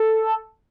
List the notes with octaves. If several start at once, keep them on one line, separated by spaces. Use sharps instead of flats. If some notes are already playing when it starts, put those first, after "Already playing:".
Already playing: A4